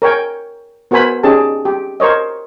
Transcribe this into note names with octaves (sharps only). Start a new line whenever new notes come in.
A#4 C#5 G5 G#5
B3 F#4 A#4 C5 G#5 B5
C#4 D#4 G4 G#4 A5
G4
A#4 C5 C#5 D#5